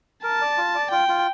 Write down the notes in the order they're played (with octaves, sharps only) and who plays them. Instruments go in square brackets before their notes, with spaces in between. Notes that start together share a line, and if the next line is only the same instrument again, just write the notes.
[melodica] A#4 [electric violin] A5
[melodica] D5
F4
D5
[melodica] F4 [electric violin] G5
[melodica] F4